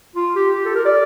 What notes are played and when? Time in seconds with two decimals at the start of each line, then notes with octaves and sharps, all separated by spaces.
0.16 F4
0.36 G4
0.55 G4
0.65 A4
0.75 A#4
0.85 D5